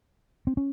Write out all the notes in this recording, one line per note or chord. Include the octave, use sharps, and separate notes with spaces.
C4
C#4